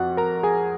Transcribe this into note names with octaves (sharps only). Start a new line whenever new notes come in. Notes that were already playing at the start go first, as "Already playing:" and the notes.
Already playing: F2 F#4 F#5
A#4 A#5
G#4 G#5